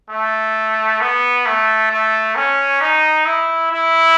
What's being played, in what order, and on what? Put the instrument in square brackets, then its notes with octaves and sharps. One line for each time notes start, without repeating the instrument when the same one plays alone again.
[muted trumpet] A3
B3
A3
A3
C#4
D#4
E4
E4